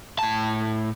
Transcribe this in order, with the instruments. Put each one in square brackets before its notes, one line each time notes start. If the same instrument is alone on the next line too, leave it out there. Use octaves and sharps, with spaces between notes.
[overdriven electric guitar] A2 A5